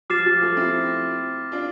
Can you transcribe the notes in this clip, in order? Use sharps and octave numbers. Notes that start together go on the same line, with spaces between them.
F3 D6 F6 A6 C7 E7
F3
F3 A3
C4 E4
D4 F4